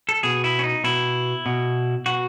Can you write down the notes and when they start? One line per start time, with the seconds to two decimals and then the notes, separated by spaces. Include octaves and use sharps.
0.09 A4
0.23 B2 G#4
0.44 E4
0.59 C#4
0.64 D#4
0.84 B2 E4
1.46 B2
2.06 B2 F#4